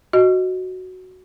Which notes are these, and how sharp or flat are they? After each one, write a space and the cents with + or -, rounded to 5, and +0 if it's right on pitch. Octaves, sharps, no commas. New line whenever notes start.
F#4 +0 D#5 +0